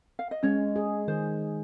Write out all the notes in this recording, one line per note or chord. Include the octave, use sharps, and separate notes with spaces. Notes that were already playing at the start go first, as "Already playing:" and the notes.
F5
D#5
G#3 C#4 C#5
G#4
D#3 C5